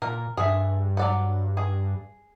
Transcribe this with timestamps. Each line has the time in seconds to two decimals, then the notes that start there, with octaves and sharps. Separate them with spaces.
0.02 A#2 A#4
0.37 G2 G#4 E5
0.97 F#3 D5 F#5
1.57 G#4